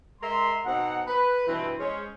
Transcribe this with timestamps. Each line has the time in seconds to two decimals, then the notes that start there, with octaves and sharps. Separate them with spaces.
0.22 G#3 A#4 E5 C6
0.65 B2 C4 D#4 F#5
1.07 B4
1.47 G2 B2 E3 C4 B4
1.78 G#3 C#4 C5